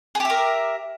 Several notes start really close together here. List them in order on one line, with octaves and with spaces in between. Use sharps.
G#4 G4 E5 A#4